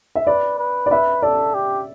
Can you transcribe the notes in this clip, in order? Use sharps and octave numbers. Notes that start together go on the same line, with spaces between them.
E5
B4 D5
B4
D5
B4 E5
A4 D5
G4